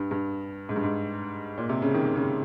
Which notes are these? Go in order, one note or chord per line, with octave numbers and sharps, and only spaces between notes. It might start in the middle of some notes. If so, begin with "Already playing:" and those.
Already playing: G2
G2
G#2
G2
G#2
A#2
C3
C#3
D#3
D#3
C#3